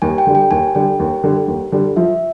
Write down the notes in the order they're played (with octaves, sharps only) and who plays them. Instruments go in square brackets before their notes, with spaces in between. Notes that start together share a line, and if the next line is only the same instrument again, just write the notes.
[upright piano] D#2 [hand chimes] G#5
[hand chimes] G5
[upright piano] D3 G3
[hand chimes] G5
[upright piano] D#2 [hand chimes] G#5
[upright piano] D3 G3 [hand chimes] G5
[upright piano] D#2
D3 G3
D#2
D3 G3
[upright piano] F3 [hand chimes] E5